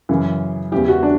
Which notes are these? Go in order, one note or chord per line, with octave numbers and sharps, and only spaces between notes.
F#2 C#3 E3
E2 C#3 E3 G4
F#4
D4